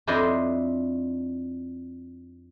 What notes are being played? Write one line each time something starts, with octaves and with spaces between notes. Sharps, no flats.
F2 D4 E4 C5 D#5